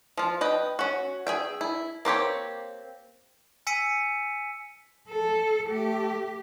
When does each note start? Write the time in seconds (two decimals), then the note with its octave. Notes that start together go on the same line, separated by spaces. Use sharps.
0.17 F3 F4
0.41 B4 D#5 G5
0.79 C#4 F#4
1.27 G#4 E5 G5
1.61 E4
2.05 A#3 C4 G4 C#5
3.67 G#5 E6 B6 C#7 D#7
5.09 A4
5.70 A3 G4